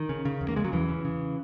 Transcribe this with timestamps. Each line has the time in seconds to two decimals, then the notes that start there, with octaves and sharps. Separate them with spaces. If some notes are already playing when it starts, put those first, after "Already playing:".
Already playing: D#3
0.09 C#3
0.25 C#3
0.41 E2
0.48 A#3
0.56 C#3 G#3
0.65 F#3
0.73 E2 E3
0.88 C#3
1.05 C#3